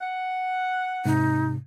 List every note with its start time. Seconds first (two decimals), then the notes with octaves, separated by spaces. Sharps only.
0.02 F#5
1.05 G#2 C3 D#4